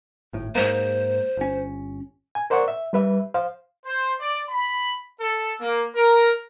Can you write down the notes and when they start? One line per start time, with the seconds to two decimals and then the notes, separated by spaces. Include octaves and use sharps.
0.33 G#1 A2
0.55 G#2 G#3 A#3 C5
1.37 G1 C#4
2.35 G#5
2.50 A#4 C5 D5 F#5 C#6
2.68 E5
2.93 G3 B4 E5
3.34 C5 F5
3.86 C5
4.20 D5
4.50 B5
5.21 A4
5.61 A#3
5.96 A#4